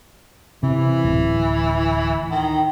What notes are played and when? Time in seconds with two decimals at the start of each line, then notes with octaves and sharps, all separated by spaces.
0.63 C3 E3
1.04 D1
2.31 D#3